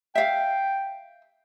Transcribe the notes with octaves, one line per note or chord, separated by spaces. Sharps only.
E5 F5 G5